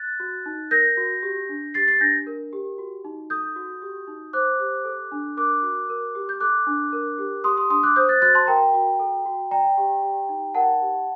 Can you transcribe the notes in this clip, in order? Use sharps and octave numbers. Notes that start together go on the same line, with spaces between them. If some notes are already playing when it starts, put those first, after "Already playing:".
Already playing: F#6 A6
F#4
D#4
A#4 G6 A#6
F#4
G4
D4
G4 A6 C7
A6 C7
D4 G6 A#6
A#4
G4
F#4
D#4
A4 D#6 G6
F#4
G4
D#4
C5 D6 F#6
G4
A4
D4
A#4 D6 F#6
F#4
A#4
G4
G6
A4 D6 F#6
D4
A#4
G4
G4 C6 D#6
C6 D#6
D4 C6 D#6
D6 F#6
C5 D#6 G6
F#6 A6
F#4 F#6 A6
A5 C6
A#4 G5 A#5
F#4
A4
F#4
D5 G5 A#5
G4
G4
D#4
A#4 F#5 A5
G4